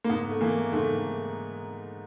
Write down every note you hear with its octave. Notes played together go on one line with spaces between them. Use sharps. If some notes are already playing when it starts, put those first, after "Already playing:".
A#3
G#2 B3
A3
E3 A#3
G#2 A3